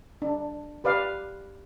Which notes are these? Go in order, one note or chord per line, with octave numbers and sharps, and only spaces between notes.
D4
G4 B4 D5 F5